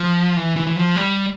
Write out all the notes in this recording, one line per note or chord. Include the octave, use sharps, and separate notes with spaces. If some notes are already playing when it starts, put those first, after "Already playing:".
Already playing: F3
E3
E3
E3
F3
G3